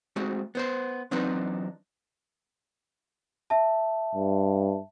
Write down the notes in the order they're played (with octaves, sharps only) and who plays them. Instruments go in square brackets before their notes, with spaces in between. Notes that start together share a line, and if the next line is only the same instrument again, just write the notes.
[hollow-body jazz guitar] G#3 A3 C4 F#4
B3 C5 C6
E3 F#3 C4 D4 D#4 B4
[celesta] E5 A5
[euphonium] G2